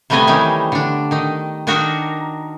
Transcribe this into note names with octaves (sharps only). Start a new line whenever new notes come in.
C3 G3 A3 B3 D#5 G#5
D#3 E3 G3 C#4 D#4
D3 D4
D#3 D#4
D#3 D4 D#4 F#4 A#4